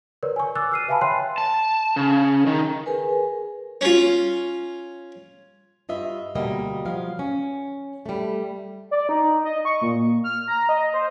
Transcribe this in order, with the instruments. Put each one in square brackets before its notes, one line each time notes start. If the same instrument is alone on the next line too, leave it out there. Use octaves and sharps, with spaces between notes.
[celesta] A#4 B4 C#5 D5
G#5 C#6
D6 E6 F#6 A6
F6 C7 D#7
B4 E5 F5 G#5 A5 B5
C#5 G5 C6 F#6 C7
[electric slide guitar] A5
C#3
D#3
[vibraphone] G#4 A#4 B4 G#5
[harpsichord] C#4 F4
[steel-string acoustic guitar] G2 F4 D#5 E5
D2 B2 G3 A#3 D#5
F3 F#3 F5
C#4
G3 A3
[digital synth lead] D5
D#4
D#5
C#6
A#2
F6
A#5
D#5
C5